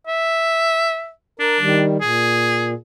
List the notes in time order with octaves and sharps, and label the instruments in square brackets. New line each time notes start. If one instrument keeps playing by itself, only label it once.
[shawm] E5
[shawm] D4 [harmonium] A#4
[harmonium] D#3 G3
[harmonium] A#2 [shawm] G#4